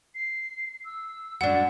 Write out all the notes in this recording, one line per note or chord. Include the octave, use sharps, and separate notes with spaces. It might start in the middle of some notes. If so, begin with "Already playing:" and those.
C7
E6
F#2 D4 F#5